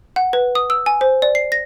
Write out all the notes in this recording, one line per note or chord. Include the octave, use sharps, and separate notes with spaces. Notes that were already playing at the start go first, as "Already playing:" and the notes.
F#5
B4
D#6
E6
G#5
C5
D5
C7
A#6